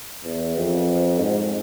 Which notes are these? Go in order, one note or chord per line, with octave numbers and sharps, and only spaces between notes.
E2
F2
G#2